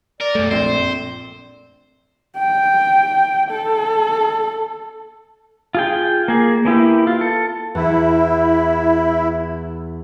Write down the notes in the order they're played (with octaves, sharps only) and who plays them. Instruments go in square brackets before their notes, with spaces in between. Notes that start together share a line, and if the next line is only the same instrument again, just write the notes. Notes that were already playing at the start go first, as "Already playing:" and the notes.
[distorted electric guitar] A#4 [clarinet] D5
[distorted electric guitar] B1 [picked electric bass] F#2 A3
[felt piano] A#1 [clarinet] C4 [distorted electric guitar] C5
[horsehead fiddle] G5
A4
[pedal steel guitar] F4 G#4 G5
A#3 G#4
A#3 B3 E4 G4
F4
A4
[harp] E2 [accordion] E4